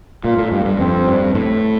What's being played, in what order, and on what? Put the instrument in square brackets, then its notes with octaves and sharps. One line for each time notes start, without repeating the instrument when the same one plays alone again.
[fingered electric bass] A#2 [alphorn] F4
[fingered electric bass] A2
G2
G2
[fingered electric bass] F2 [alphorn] C4
[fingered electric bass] G2
A2